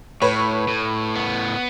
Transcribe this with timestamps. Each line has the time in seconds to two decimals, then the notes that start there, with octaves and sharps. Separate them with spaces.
0.22 A2 B4 C#5
0.68 A2
1.15 B3